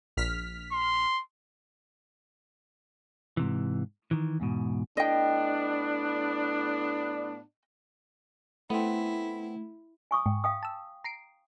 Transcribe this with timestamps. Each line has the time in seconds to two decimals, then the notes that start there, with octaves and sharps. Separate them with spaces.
0.17 A#1 F6 B6
0.72 C6
3.37 G#2 C3 E3
4.11 D#3 E3
4.40 E2 G#2 B2
4.97 A2 B3 D4 D#5 G5
8.70 A3 B3 C4 E4
10.11 G#5 C#6 D#6
10.26 G#2 G5
10.44 F5 G5 D#6
10.63 A5 E6
11.04 A#5 C7 D7